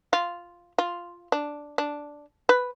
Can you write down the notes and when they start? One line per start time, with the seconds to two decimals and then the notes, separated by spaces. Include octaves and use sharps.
0.13 F4
0.78 F4
1.32 D4
1.78 D4
2.49 B4